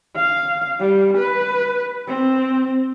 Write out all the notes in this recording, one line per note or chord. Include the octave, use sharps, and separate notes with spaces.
F5
G3
B4
C4